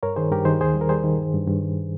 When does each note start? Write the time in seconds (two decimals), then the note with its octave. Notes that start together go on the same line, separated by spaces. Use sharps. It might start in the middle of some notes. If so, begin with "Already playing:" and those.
0.03 G2 A#4 C#5
0.16 D#3 G#4 C5
0.31 G2 G4 A#4
0.45 D#3 G#4 C5
0.60 D#2 G#4 C5
0.74 G3
0.81 A#4
0.89 G3 G#4 C5
1.04 D#3
1.18 G2
1.34 G2
1.48 G2
1.62 D#3